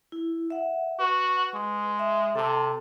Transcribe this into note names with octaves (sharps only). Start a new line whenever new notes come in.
E4
E5 F#5
F#4 B4
G#3
E5
C3 A4 A5